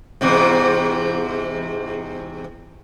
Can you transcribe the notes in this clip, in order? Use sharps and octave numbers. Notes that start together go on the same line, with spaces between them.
E2 G#2 C3